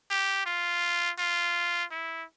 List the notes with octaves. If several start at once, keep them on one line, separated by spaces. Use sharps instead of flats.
G4
F4
F4
E4